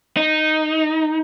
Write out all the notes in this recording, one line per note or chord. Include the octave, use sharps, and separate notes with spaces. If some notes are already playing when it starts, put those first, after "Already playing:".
D#4